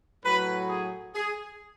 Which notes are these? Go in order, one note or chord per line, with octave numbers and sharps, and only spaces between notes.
A2 F#3 B4
G#4
G#4